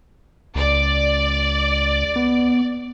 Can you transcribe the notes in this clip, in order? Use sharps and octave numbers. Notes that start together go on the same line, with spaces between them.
C#2 D5
B3